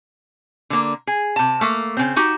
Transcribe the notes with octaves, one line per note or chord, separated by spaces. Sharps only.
D3 A#3
G#4
C3 A5
A3 A#3
C#3 C4
D#4 F#4 G4